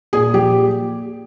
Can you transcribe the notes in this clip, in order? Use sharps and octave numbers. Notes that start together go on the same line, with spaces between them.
A#2 G#4
F3 G4